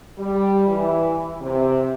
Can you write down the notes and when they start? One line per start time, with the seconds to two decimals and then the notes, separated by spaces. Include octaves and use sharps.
0.18 G3
0.68 E3
1.41 C3